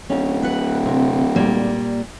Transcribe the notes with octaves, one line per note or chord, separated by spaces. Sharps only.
D1 C#4
B4 F#5
C3
A#2 G3 A#3